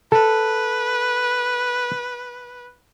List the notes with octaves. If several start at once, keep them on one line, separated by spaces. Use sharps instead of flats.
A4 B4